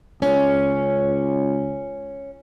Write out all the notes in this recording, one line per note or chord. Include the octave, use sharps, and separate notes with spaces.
C#2 C#4